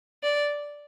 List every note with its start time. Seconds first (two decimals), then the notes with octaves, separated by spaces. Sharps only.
0.23 D5